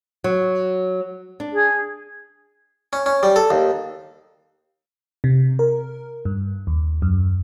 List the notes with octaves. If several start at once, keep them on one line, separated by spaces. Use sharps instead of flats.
F#3
D4
G#4
C#4
C#4
G3
A4
D#2
C3
A#4
G2
D#2
F#2